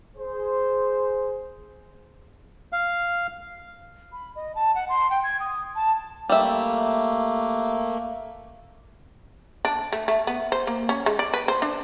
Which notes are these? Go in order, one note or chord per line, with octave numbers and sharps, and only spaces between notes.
G#4 C5
F5
B5
D#5
A5
F#5
C6
G5
G#6
D#6
A5
G3 A3 A#3 E5
D4
A3
A3
B3
C5
A#3
C#4
G#3
D5
B4
C5
D4